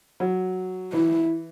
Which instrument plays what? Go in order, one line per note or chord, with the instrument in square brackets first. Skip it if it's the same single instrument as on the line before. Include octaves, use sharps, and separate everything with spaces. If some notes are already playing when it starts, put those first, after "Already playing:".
[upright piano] F#3
[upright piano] E3 [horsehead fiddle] E4